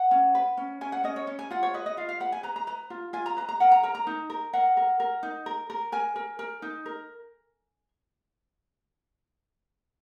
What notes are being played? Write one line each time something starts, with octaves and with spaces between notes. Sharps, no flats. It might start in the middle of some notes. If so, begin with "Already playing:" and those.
Already playing: F#5
C#4
B4
C#4
C#4 G#5
F#5
C#4 D#5
C#5
C#4
G#5
F4 F#5
C#5
B4 D#5
D#5
F4 F5
F5
B4 F#5
G#5
B4 A#5
A#5
B4 A#5
F4
F4 G#5
A#5
B4 A#5
A#5
A#4 F#5
A#5
A#4 A#5
A#5
D#4
A#4
A#4 F#5
A#4
A#4
D#4
A#4
A#4
A#4 G#5
A#4
A#4
D#4
A#4